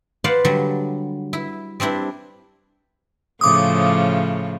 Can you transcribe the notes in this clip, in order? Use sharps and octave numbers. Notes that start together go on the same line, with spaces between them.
B4 C5 D5 F5 F#5
D3 F#3 G3
E4
G3 C4 D4 E4
A2 C#3 F3 D6 D#6